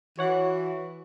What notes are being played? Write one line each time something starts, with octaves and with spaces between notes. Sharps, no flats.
E3 F#4 C#5 F#5